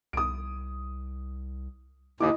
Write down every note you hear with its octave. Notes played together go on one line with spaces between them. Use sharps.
C2 D#6 D7
D#2 E4 D#5 D6 D#6